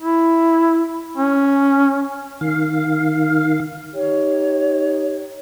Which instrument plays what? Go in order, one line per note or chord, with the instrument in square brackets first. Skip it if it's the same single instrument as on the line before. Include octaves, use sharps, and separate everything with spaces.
[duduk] E4
C#4
[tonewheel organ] D#3 F5
[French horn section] D#4 G4 [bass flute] C#5